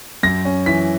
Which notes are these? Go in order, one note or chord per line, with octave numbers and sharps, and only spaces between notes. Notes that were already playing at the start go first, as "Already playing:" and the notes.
F#2 A#6
C#4
E3 B6